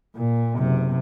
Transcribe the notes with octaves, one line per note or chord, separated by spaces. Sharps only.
A#2
F#1 C3